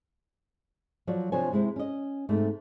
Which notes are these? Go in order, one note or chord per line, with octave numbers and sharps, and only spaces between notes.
F3 F#3 C#5 D5
C3 F3 D4 C5 C#5 G#5
C3 G#3 E4 C5
C#4 D#5
G#2 C3 A3